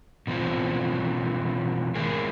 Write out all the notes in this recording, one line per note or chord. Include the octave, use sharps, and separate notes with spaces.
B2 E3 F3 C4
D#3 G#3 E4 G#4 A#4